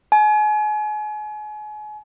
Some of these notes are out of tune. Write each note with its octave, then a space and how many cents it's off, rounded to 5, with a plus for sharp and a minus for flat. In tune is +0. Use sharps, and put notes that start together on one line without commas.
G#5 +35